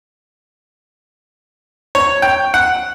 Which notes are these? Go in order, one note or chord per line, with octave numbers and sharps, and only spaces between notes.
C#5
G5
F#5